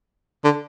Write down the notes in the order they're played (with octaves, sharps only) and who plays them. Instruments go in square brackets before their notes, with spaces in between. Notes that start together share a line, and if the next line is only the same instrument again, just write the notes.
[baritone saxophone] D3